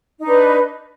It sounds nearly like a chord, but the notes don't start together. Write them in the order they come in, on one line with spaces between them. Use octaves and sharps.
D#4 D4 B4